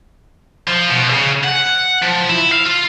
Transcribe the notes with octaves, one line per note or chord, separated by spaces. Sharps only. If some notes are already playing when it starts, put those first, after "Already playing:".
F3
B2
C#3
F#5
F3
E4
F5
F4